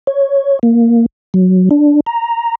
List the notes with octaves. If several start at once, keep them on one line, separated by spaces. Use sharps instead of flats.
C#5
A#3
F#3
D4
A#5